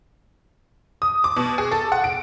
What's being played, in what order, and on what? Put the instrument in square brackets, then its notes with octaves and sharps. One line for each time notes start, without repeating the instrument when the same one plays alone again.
[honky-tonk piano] D#6
D6
B2
G#4
A4
F#5
D7